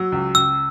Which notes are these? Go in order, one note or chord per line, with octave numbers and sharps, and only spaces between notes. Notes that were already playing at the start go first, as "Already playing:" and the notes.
Already playing: F#3 E6
C#2
C#2 E6